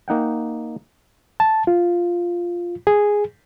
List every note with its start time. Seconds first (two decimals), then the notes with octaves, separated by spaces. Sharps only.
0.08 A#3 D#4 F#5 G5
1.40 A5
1.67 F4
2.87 G#4